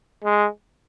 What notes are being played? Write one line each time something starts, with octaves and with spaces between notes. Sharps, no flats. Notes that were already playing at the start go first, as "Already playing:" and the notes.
G#3